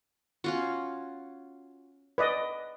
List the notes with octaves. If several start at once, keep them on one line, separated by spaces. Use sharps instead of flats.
C#4 F4 F#4
B4 D5 D#5